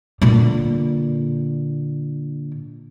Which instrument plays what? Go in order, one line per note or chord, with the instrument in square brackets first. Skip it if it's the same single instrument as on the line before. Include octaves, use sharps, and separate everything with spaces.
[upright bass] A#2 D3